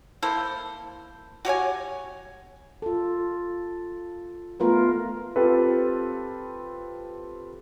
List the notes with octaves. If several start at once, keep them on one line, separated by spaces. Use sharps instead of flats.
A#3 E4 A4 C5
F#4 G4 C#5 G#5
F4 A4
A3 B3 F4 A#4 B4
C4 F4 G4 A4 B4